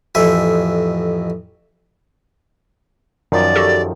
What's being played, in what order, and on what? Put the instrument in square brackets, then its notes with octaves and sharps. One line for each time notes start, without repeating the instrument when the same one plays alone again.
[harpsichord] A1 F2 E5 G#5
[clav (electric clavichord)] F#2 D#3 F3 [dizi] D5
[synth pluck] F#4 G4 A4